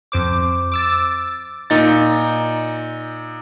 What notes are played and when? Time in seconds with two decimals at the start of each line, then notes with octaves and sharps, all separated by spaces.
0.12 F2 C5 D6
0.72 D6 E6 A6
1.70 A#2 D#4 A6